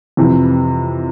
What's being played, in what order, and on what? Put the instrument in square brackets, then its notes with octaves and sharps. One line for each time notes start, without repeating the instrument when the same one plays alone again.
[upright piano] F2 C3 E3